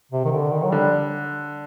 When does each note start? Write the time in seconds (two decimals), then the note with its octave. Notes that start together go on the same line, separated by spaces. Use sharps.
0.12 C3
0.25 D#3
0.32 D3
0.52 D#3
0.64 F#3
0.71 D3 G3